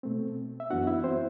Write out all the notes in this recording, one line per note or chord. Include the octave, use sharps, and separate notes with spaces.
B2 A3 C4
E5
F#2 E3 B3 D4 F#4 F#5
E4 E5
C4 C5